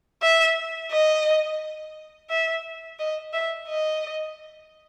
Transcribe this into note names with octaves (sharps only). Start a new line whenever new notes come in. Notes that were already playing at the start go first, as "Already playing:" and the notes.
E5
D#5
E5
D#5
E5
D#5